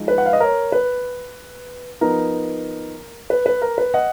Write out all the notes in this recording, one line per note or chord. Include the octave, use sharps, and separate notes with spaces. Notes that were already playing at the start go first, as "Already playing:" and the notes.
Already playing: F3 G#3 D#4
B4
F#5
F5
D#5
A#4 C#5
B4
F3 B3 D#4 A#4
B4
B4
A#4
B4
D#5 F#5